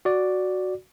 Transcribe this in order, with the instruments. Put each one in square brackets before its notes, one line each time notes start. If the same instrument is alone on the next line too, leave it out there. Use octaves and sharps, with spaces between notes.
[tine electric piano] F#4 D5